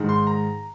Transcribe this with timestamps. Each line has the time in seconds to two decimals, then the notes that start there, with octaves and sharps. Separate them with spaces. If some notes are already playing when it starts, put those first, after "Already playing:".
Already playing: G#2 D#3 G#3
0.09 C6
0.27 A#5